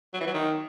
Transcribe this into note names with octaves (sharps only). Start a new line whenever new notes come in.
F#3
E3
F#3
D#3